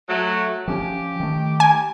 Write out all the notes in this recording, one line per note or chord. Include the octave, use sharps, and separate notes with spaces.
F#3 A3
F3 C#4 G4
D#3 A3
G#5